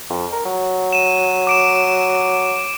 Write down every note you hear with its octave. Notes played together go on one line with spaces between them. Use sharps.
F2
A#4
F#3
D#7 E7
D6 D7 E7